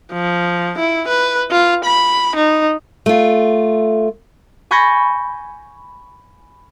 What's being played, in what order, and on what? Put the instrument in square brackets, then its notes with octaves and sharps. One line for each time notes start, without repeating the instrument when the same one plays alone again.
[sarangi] F3
E4
B4
F4
B5
D#4
[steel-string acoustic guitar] A3 F4
[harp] G#5 B5 C#6 G6 A6 A#6